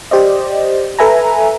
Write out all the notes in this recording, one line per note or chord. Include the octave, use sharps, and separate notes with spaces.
G4 C5 D5 D#5
A4 B4 E5 G#5 A#5